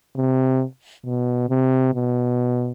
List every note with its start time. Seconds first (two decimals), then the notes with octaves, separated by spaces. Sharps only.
0.16 C3
1.05 B2
1.49 C3
1.94 B2